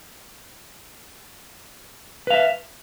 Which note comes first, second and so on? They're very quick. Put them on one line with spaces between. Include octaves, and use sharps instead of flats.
B4 F5 E5